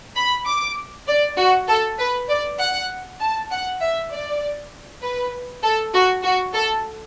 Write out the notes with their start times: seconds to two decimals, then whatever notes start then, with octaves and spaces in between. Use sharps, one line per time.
0.16 B5
0.47 D6
1.08 D5
1.37 F#4
1.68 A4
1.99 B4
2.29 D5
2.59 F#5
3.21 A5
3.51 F#5
3.81 E5
4.11 D5
5.02 B4
5.63 A4
5.94 F#4
6.24 F#4
6.54 A4